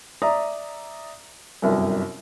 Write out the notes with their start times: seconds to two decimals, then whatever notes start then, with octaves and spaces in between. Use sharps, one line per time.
0.22 D5 E5 A#5 D#6
1.62 G1 C2 F#2